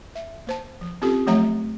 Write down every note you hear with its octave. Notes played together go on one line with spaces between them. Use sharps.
E5
A#3 C5 A5
F3
C4 C#4 F4 G4 A4
F3 F#3 A3 C#5 E5 A#5